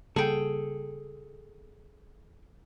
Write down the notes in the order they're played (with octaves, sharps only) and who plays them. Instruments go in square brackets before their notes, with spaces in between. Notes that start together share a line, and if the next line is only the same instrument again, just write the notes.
[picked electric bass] C#3 G3 A#3 [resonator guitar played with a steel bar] G#4 G5 [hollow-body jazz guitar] A4